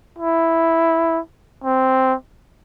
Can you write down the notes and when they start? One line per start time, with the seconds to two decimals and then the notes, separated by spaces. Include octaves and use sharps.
0.18 E4
1.64 C4